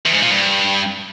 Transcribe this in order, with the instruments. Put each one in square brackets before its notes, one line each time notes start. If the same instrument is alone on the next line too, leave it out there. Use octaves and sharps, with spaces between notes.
[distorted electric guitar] E2
G#2
A#2
G2